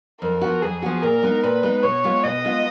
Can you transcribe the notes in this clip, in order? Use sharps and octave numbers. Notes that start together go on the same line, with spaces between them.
F2 A#4
F3 B3 F#4
F2 G#4
F3 B3 F#4
A#2 A#4
G#3 B3 D#4
A#2 B4
G#3 B3 D#4
B2 C#5
G#3 B3 F4
B2 D#5
G#3 B3 F4